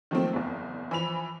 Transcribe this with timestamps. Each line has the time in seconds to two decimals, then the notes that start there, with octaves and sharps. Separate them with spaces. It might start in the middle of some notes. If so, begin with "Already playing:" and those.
0.11 D#3 F3 F#3 A3 A#3 C4
0.33 F#1 E2
0.91 E3 F3 B5 F7